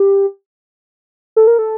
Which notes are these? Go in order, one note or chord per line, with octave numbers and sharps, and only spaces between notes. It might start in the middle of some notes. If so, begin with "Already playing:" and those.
Already playing: G4
A4
A#4
A4